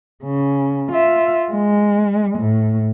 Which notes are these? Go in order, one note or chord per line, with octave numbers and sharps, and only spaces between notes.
C#3
F4 E5
G#3
A2